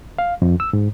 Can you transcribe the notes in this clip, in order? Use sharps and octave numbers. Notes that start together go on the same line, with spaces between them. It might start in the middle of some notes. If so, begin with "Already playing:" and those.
F5
F2
E6
G#2